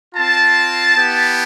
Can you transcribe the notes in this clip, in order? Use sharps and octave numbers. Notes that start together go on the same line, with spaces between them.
C4 F4 A5
B3 E4 G4